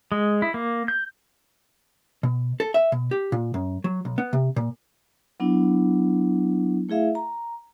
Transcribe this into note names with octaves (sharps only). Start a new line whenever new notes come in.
G#3
E4
A#3
G6
B2
A4
E5
B2
G4
A#2
F#2
F#3
B1
B3
C3
A#2
F#3 B3 D4 E4
A3 E4 G#4 E5 F5
A#5